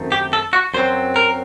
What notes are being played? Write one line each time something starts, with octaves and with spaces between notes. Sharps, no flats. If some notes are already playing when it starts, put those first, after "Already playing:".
Already playing: F#2 D#3 A3 C4
G4
A4
F#4
F#2 F#3 C4 C5
A#4